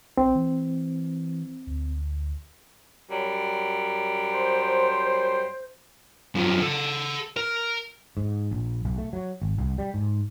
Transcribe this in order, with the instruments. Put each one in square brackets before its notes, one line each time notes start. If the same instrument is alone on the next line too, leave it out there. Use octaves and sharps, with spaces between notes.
[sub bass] A#1 [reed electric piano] C4
[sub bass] E3
D2
[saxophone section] F#2 F#3 G3
[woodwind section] C5
[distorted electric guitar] F#2 F3
A4 F#5
A#4
[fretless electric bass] G#2
A#1
B1
A3
F#3
G#1
C2
G3
G#2